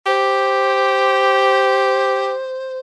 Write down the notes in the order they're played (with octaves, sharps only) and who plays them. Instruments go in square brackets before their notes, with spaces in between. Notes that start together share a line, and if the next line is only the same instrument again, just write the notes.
[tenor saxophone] G4 [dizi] C5